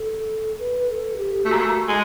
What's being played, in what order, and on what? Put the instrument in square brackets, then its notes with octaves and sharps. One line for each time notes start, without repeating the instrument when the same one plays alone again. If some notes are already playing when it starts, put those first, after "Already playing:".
Already playing: [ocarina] A4
B4
A4
G4
[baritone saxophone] A3 [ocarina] F#4
[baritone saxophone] A#3
A3
G#3